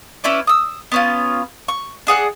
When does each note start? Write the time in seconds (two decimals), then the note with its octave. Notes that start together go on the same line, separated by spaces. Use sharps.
0.24 C#4 E4 B4 D5
0.47 D#6 E6
0.92 B3 C#4 F4
1.68 C#6
2.07 D4 G#4 F#5 F#6